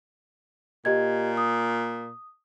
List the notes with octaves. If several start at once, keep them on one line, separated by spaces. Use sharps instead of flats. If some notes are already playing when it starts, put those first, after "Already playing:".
A#2 G4 D#5 G#6
D#6